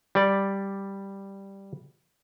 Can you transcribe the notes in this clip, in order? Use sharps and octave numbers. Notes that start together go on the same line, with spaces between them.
G3 D5